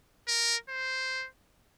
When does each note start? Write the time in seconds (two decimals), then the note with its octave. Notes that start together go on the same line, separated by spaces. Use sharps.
0.28 A#4
0.69 C5